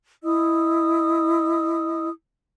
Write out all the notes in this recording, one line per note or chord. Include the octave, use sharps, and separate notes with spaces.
E4 D#5 D#6 E6